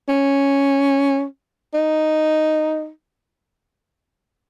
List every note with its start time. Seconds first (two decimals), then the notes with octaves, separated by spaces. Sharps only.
0.08 C#4
1.74 D#4